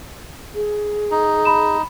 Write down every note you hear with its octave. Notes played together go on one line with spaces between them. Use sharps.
G#4
D#4
B5 E7